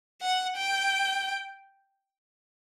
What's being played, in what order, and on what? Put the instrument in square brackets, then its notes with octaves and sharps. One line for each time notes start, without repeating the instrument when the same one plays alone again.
[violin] F#5
G5